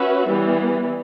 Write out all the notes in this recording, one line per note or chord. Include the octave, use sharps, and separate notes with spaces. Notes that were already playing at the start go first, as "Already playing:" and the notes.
Already playing: C#4 F#4 B4 E5
E3 G3 B3